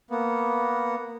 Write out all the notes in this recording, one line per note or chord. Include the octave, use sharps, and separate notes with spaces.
A#3 B3